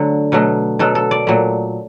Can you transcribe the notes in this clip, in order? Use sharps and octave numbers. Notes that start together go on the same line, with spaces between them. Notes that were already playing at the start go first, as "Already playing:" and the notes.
Already playing: D3 F#3 A3
B2 F#3 A3
B2 F#3 A3 A4
A4
D5
A#2 F#3 A3